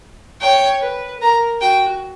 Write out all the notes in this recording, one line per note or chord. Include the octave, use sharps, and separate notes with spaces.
C#5 G5
B4
A#4 A#5
F#4 G5